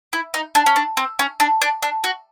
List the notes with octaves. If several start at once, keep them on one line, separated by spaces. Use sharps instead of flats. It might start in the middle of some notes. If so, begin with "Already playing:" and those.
E4
D#4
D4
C#4
D4
C4
C#4
D4
D4
D4
F#4